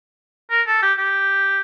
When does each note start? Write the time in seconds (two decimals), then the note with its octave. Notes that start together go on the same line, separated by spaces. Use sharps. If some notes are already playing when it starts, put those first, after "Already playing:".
0.51 A#4
0.67 A4
0.82 G4
0.98 G4